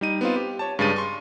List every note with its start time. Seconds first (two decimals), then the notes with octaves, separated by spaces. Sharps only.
0.01 G3 D#4 D#7
0.21 B3 C4 F4
0.36 G4
0.59 C#5 A5
0.79 G2 C#3 G#3 A6 D#7
0.96 C6 C#6